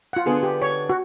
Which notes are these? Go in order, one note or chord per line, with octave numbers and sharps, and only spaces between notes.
F4 F#5
D3 B3 D4 G#4
G4
C#5
F#4